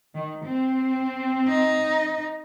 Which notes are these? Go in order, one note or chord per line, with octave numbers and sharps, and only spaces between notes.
D#3
C4
D#4